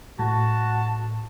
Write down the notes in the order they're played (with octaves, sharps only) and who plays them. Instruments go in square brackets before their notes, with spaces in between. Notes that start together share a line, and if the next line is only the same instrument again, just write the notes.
[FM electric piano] A2 [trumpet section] F#4 A5